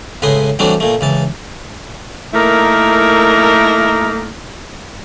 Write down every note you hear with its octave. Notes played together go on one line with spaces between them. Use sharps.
C#2 A2 B4 G#5 C6 D#6
E3 F#3 G3 A3 C4 D4
A#2 A3
C#2 E3 A5
A3 A#3 D#4 E4 A#4